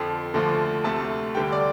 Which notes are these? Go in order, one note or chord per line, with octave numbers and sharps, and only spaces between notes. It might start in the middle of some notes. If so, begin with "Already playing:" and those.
Already playing: F2 D3 F3 G5
D2 D3 F3 A3
D2 C3 A3 A5
D2 D3 G3 G5
D5